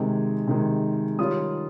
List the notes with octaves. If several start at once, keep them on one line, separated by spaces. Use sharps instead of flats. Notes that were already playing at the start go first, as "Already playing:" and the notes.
Already playing: C3 D#3 G#3
C3 D#3 G#3
D#3 G3 C#4 F4 D#6